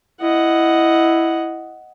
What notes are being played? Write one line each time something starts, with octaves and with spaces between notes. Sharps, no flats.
E4 D#5 F#5